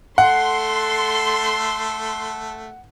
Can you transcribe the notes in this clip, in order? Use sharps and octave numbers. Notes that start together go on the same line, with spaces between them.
A3 A4 F#5 C6